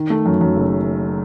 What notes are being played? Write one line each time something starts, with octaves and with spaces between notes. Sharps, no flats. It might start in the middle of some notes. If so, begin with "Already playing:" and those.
Already playing: D#3
A3
F#2
F#2
F#1